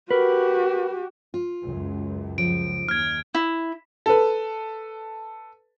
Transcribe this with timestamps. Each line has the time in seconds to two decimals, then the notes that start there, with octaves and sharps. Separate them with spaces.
0.11 F#4 G4 A#4 B4
1.34 F4
1.64 C#2 F#2
2.38 F3 D7
2.89 D#2 F6 G#6
3.35 E4
4.06 A4 B4